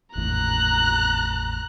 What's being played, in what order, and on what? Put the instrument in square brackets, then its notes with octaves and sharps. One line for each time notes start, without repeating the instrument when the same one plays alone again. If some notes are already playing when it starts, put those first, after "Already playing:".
[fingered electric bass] G#1 E2 A2 [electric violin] A#5 F#6